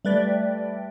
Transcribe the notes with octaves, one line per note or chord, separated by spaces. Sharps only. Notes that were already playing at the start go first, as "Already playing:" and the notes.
G3 A3 B4 D5